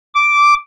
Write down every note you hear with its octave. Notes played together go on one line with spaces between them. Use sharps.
D6